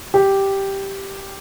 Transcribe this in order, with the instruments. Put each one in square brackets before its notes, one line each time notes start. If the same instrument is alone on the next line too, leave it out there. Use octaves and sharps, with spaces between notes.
[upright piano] G4